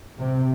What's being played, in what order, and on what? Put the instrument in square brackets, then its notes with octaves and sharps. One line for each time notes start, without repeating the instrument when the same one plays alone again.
[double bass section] C3